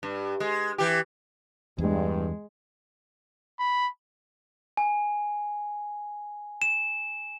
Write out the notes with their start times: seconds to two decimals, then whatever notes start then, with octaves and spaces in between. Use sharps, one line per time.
0.03 G2
0.40 G#3
0.78 E3 G4
1.78 E2 G2 G#3
3.59 B5
4.77 G#5
6.62 E7